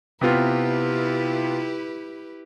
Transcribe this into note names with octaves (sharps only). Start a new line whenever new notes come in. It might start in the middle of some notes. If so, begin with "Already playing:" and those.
C3 B3 E4 F4 G4 B4